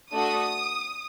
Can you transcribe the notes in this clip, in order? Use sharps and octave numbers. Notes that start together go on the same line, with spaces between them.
A3 D4 F#4 A4 D#6